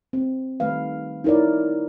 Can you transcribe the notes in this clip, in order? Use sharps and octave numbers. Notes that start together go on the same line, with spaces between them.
C4
D#3 G3 A3 B4 F5
D#4 E4 A#4 C#5 D5